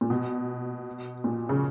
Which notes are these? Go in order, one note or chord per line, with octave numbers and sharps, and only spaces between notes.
A#2
B2
A#2
C#3